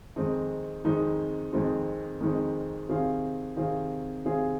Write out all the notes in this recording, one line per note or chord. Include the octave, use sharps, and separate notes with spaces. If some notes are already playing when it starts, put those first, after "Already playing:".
F2 D#3 G#3 C4 D#4
F2 D#3 G#3 C4 D#4
F2 D#3 G#3 C4 D#4
F2 D#3 G#3 C4 D#4
C3 D#3 C4 G#4 F5
C3 D#3 C4 G#4 F5
C3 D#3 C4 G#4 F5